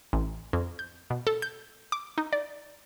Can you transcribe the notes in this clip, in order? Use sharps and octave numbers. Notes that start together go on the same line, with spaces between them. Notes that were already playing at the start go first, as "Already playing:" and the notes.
A1
F2
G6
B2
A4
G6
D6
D#4
D5